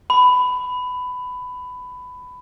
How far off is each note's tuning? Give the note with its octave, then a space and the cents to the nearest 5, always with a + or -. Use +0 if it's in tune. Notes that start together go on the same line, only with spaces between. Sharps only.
B5 +15